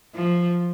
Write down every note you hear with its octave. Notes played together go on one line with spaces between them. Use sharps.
F3